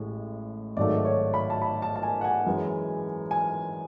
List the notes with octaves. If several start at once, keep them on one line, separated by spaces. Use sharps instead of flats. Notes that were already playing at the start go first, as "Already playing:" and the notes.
Already playing: A1 A2 G#3
G#1 G#2 F#3 A3 D5
C#5
B5
A5
B5
A5
A5
G#5
F#5
G#5
F#2 E3 G#3
G#5